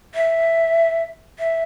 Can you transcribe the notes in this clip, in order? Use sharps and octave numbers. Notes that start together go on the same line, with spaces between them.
E5
E5